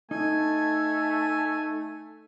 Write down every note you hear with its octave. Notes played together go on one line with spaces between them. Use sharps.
A3 D#4 G#5